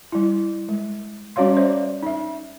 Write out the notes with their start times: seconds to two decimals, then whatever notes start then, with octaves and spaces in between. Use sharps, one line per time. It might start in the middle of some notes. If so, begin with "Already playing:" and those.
0.12 G3 E4
0.69 G#3
1.36 G3 C#4 F#4 C#5 F5 C6
1.57 C5 D5 E5
2.03 D#4 E5